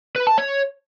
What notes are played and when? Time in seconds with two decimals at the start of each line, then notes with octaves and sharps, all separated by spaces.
0.16 B4
0.27 A5
0.38 C#5